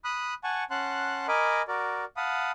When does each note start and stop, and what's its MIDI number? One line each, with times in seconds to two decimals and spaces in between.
0.04 0.34 83
0.04 0.34 87
0.04 0.34 90
0.44 0.64 78
0.44 0.64 80
0.44 0.64 81
0.44 0.64 85
0.71 1.27 61
0.71 1.27 78
0.71 1.27 81
0.71 1.27 84
0.71 1.27 90
1.28 1.62 70
1.28 1.62 75
1.28 1.62 80
1.28 1.62 83
1.28 1.62 86
1.68 2.05 66
1.68 2.05 70
1.68 2.05 74
2.17 2.51 77
2.17 2.51 78
2.17 2.51 81
2.17 2.51 83
2.17 2.51 87